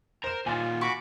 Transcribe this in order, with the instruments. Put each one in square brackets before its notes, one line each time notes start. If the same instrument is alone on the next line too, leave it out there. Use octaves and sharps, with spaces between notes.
[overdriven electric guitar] A#4 A#5 [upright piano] C5 E7
[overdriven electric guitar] A#2 D#3 [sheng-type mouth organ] F4 [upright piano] G#5 A6
[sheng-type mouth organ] F#4 B5 D6 [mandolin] C#6